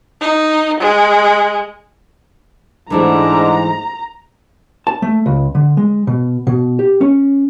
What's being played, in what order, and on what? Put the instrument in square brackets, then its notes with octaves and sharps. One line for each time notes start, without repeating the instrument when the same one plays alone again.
[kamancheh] D#4
G#3
[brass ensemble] G#2 [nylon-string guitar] E3 A3 E4 [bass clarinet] D4 [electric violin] A#5
[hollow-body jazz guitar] A5
A3
C#2
D3
G#3
B2
B2
G4
C#4